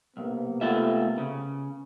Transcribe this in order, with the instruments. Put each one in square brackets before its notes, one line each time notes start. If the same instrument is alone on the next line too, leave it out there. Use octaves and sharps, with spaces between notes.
[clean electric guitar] B1 [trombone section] C3 A#3 B3
[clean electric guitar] A3 F4 E5
C#3